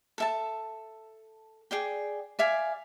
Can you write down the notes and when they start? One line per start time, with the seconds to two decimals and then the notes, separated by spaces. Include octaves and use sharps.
0.18 A4 E5 A5
1.71 G#4 D5 G5
2.39 D5 E5 F5 G#5